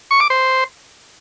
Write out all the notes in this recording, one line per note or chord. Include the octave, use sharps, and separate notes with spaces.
C#6
D6
C5